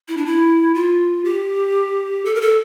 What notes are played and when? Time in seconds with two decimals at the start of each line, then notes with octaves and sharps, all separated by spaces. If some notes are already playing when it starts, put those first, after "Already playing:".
0.08 E4
0.17 D4
0.26 E4
0.74 F4
1.25 G4
2.25 A4
2.35 A#4
2.41 A4